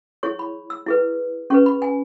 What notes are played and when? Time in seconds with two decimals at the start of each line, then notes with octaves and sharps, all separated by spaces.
0.23 E4 G#4 C#5 C#6
0.39 B5
0.70 E6
0.86 E4 G#4 B4
1.50 C#4 G#4 B4 C#6
1.66 B5
1.82 G#5